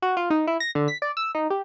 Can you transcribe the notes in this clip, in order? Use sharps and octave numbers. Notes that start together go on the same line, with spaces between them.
F#4
F4
D#4
E4
A#6
D3
B6
D5
E6
D#4
G4